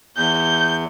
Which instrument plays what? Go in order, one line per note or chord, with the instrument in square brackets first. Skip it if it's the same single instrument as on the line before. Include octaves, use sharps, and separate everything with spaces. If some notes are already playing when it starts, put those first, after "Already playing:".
[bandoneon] E2 [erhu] G6